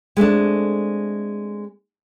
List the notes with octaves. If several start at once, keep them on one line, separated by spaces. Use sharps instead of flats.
G#3 A3 C4 D4